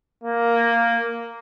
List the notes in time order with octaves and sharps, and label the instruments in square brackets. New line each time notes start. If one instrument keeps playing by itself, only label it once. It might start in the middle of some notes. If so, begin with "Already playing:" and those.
[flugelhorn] A#3